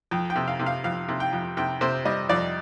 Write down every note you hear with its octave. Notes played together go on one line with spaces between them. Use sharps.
F2 G5
G5
C3
F5
C3
F5
F2 F5
C3
G5
F2
C3 G5
C3 C5
G3 D#5
F2 D5